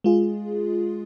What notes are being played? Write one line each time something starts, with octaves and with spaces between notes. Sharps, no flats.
G#3 F4 G#4